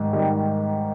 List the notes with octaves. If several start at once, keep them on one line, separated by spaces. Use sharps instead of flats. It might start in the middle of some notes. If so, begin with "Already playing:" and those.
Already playing: G#2 D#3 G3
G#2 D#3 G3